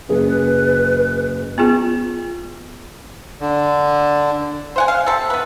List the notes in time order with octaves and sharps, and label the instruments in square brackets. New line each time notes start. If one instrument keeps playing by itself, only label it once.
[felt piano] F#1 G#4 [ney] B4
[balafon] B3 F4 G#4
[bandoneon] D3
[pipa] C5 F#5 G#5
F5
C3 A4
B3 B4